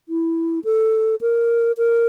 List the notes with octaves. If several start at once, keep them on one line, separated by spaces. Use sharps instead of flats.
E4
A4
A#4
A#4